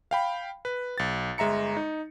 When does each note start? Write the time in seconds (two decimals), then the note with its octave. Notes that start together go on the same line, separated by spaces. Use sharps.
0.11 F5 G5 B5
0.65 B4
0.98 B1 A6
1.38 G1 G#3 E5 A#5 C#7
1.77 D#4